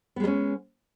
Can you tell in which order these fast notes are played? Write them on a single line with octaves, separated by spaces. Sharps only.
B3 G#3 G3 C#4